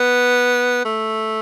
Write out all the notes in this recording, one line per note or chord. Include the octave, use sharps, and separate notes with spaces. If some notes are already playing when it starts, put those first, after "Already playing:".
Already playing: B3
A3